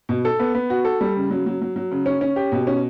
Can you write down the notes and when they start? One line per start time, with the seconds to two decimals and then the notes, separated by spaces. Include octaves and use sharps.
0.09 B2
0.25 A4
0.40 B3
0.55 B3
0.70 F#4
0.85 A4
1.01 G3
1.16 C#3
1.31 F#3
1.46 F#3
1.62 F#3
1.76 F#3
1.92 C#3
2.06 C#4
2.21 C#4
2.36 G4
2.52 B2
2.67 C#4